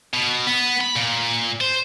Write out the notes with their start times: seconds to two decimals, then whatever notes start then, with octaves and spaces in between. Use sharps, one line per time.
0.14 B2
0.47 B3
0.81 B5
0.96 A#2
1.61 C5